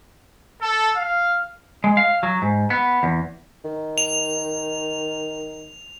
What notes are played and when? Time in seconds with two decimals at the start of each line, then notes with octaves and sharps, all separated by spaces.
0.60 A4
0.95 F5
1.84 G#3
1.97 F5
2.23 F#3
2.42 G#2
2.70 B3
3.03 E2
3.65 D#3
3.98 F7